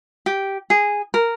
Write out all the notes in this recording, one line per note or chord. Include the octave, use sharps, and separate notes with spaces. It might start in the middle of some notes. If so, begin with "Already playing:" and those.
G4
G#4
A#4